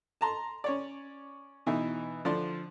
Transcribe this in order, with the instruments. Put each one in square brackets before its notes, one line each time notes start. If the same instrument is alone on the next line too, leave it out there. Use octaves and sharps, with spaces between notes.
[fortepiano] A5 A#5 C6
C#4 C#5 D5
B2 E3 D#4 E5
D3 F3 D4 D5 C6